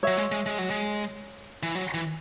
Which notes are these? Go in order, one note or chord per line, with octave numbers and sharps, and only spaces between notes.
F#3 C#5 E5
G#3
G#3
G#3
F#3
G#3
E3
F#3
E3